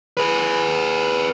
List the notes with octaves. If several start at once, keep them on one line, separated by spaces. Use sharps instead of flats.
G#4 B4